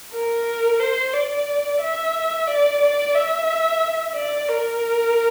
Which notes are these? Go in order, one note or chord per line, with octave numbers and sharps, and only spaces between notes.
A#4
C5
D5
E5
D5
D5
E5
D5
A#4